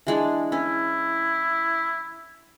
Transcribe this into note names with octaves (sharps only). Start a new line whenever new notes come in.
E3 G#3 D4
C#4 E4